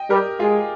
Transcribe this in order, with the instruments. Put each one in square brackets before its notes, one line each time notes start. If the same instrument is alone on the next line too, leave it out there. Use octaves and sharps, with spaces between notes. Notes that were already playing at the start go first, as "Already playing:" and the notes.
Already playing: [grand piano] D#5 G5
[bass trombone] G3 [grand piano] G4 A#4
[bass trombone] G#3 [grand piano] F4 G#4